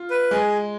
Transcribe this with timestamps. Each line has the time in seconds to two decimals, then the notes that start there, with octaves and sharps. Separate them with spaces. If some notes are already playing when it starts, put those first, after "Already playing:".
Already playing: F4
0.11 B4
0.31 G#3 G#4